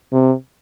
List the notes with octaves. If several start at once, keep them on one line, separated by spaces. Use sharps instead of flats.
C3